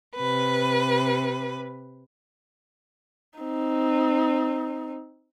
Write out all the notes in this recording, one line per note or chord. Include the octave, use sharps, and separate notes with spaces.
C3 B4
C4 D#4